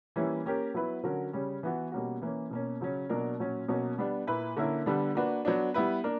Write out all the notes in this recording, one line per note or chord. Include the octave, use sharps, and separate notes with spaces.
E3 G3 A#3 C#4 E4
A#3 C#4 G4 A#4
F#3 B3 E4 B4
D3 F#3 C#4 F#4 A#4
C#3 G3 C#4
E3 B3 F#4
B2 G3 A#3 C#4 F#4
E3 A#3 C#4
B2 A#3 C#4
C#3 F#3 C#4
B2 F#3 A#3 D4 A#4
A#2 F#3 C#4
B2 F#3 A#3 C#4
G3 B3 D4
A#2 A#3 E4 B4
D3 A#3 C#4 E4 A#4
D3 G3 B3 D4
A#3 D4 F#4 B4
F#3 B3 D4
G3 B3 E4 B4
A#3 D4 A#4